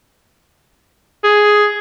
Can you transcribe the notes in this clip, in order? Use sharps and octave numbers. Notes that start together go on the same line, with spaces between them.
G#4